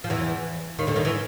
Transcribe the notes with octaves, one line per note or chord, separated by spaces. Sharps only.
F3
E2 E3
D#2 D#3
D2 D3
D#2 D#3
E3